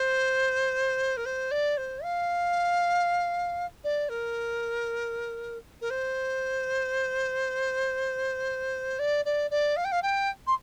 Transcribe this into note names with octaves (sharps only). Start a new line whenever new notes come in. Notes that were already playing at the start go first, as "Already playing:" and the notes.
Already playing: C5
A#4
C5
D5
C5
F5
D5
A#4
A#4
C5
D5
D5
D5
F5
G5
F5
G5
C6